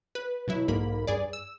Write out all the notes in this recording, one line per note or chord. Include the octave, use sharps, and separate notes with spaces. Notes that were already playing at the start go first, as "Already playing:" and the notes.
B4
B2 F#3 E4
B1 G#2 A#3 B5
G2 G#4 D5
E6